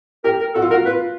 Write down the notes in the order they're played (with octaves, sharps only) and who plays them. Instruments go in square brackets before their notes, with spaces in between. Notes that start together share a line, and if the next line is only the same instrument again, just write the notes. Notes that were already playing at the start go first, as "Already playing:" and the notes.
[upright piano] G4 [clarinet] A#4
[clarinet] A#4
[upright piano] F#4 [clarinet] A4
[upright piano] F4
[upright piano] F#4 [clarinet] A#4
[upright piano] F4 [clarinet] B4